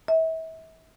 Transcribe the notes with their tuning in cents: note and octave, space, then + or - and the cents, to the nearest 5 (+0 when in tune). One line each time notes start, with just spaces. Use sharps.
E5 -35